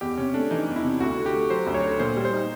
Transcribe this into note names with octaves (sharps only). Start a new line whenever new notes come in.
E2 G4
C3 C#4
A3 D4
E3 D#4
E2
E4
C3
D2 F#4
D3
G4
A3
F#3 C5
D2
C#5
D3
A#2 C5
G3
C5
D#4